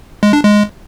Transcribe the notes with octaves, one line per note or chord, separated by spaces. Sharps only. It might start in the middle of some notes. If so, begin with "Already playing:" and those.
G#3
D4
G#3